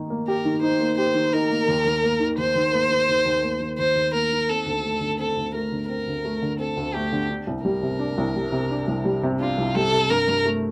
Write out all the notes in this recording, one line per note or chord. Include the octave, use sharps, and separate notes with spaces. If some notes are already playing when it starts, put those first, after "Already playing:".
Already playing: D#3 A#3 D#4
A#3
G4 A#4
D#3
D#4 C5
A#3
G4 C5
D#3
D#4 A#4
A#3
D#2
D#2
A#3
D#3
D#2 C5
D#2
A#3
D#3
D#2
D#2
A#3
D#3
D#2 C5
D#2
A#3 A#4
D#3
C4 A4
D2
A3
D3
C4 A4
D2
A3 A#4
D3
C4 A#4
D2
A3
D3
C4 A4
D2
A3 G4
D3
D4
C2
G3 A#4
C3
D4
C2
G3
C3
D4
C2
G3
C3
D4 F4
C2
G3 A4
C3
G2 A#4
G2
A3